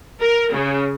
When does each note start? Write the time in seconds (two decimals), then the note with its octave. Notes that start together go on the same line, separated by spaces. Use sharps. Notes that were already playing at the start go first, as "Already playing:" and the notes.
0.21 A#4
0.53 C#3